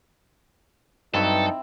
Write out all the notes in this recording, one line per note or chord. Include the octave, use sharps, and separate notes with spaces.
G2 F#3 C4 D#4 E4 A4 B4